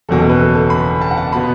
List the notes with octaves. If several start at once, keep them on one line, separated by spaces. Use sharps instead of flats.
F#1 E2 B2 A4
A4
B4
A4
A4
B5
A5
F#5
A5
B2 B3 B5